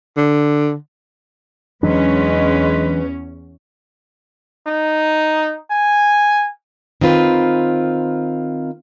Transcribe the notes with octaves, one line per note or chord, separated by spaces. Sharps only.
D3
E2 E3 F#3 G#3 C#4 D4 B4
D#4
G#5
D#3 C4 F4 B4